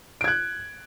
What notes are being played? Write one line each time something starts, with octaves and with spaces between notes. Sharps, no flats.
F#6 G#6 D7